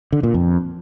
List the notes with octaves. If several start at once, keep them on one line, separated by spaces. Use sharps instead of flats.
D3
A#2
F2